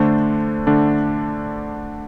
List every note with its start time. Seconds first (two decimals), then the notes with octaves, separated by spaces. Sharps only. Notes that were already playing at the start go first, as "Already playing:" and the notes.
Already playing: D3 A3 D4 C5
0.67 D3 A3 D4